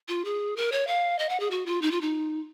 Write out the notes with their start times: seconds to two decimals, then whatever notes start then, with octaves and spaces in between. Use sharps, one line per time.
0.08 F4
0.25 G#4
0.57 A#4
0.72 C#5
0.87 F5
1.19 D#5
1.29 F#5
1.40 G#4
1.51 F#4
1.66 F4
1.82 D#4
1.91 F4
2.01 D#4